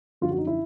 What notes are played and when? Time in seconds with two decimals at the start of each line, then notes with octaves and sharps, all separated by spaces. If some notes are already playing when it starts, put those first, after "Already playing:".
0.21 F#2 D3 F3 F4
0.30 F#4
0.38 D#4
0.47 E4